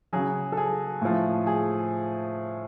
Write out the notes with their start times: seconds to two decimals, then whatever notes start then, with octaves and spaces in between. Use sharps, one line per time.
0.13 C#3 F#3 G#4
0.52 A4
0.57 G#4
1.02 A2 F3
1.47 G#4